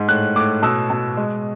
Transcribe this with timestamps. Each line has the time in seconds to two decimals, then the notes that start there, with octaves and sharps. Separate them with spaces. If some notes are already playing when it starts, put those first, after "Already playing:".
Already playing: G#2
0.08 A2 F#6
0.36 A2 D6
0.63 B2 E6
0.90 B2
1.17 G#3